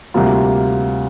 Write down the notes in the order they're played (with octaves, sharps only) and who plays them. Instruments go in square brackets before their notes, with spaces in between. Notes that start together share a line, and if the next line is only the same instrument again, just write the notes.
[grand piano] D2 C3 G3 A#3 F4